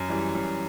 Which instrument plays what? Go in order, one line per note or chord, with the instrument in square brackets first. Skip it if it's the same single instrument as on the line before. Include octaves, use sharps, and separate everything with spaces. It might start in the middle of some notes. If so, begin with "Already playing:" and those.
Already playing: [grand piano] F#2
E3 G3
F#2